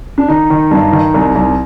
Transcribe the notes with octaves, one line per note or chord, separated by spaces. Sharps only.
D4
D#3 D#4
D#3
G2
D#3
C2
C2